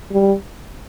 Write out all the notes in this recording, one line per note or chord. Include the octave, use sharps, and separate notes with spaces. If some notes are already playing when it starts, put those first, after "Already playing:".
G3